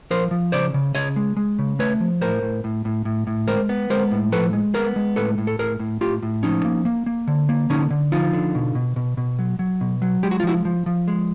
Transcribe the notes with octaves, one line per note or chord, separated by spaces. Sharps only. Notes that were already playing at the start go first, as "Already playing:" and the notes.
F3 A#4 C5
F3
C#3 C5 D5
C#3
C#3 C#5 D#5
G#3
G#3
C#3
A3 B4 C#5
F3
A2 A#4 C5
A2
A2
A2
A2
A2
G#3 A#4 C5
B3
G#3 A#4 C5
A2
F3 A4 B4
G#3
B3 G#4 A#4
G#3
A2 A4 B4
A2
A4
A2 G#4 A#4
A2
A2 F4 G4
A2
F3 C#4 D#4
A#3
A#3
A#3
D3
A#3
D3 C#4 D#4
D3
F3 D#4 F4
D3
B2
B2
B2
B2
F#3
F#3
B2
F#3
G#3 G4
F#4
F4
F3 E4 F#4
F3
F3
G#3